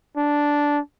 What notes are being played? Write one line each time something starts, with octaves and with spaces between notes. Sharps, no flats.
D4